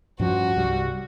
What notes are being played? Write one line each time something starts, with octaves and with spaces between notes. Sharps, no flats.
G2 F3 C#4 F#4
C2 G2 G3